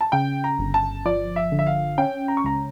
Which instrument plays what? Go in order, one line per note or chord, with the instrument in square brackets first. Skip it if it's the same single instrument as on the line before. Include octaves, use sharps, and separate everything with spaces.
[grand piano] A5
[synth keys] C#3 [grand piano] G5
[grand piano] A#5
[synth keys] G1
[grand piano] A5
[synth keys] F3 [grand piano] D5
[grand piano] E5
[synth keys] D3
[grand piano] E5
F5
[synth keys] C#4 [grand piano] G5
[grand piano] A#5
C#6
[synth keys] C#2 [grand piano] A#5